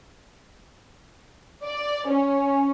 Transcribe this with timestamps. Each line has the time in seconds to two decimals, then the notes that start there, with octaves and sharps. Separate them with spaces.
1.64 D5
2.11 C#4